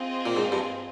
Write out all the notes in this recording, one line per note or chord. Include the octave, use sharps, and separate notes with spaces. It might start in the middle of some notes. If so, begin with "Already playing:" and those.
Already playing: C4 F4 G#4 C5 D#5
A#2
G#2
G2